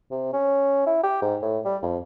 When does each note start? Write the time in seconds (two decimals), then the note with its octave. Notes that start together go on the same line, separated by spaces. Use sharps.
0.11 C3
0.33 C#4
0.87 E4
1.03 G4
1.22 G#2
1.42 A2
1.65 G3
1.83 F2